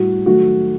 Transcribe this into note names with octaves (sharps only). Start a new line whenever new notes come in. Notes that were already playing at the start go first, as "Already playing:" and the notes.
Already playing: A2 G3 F#4
D#3 F#3 A3 F#4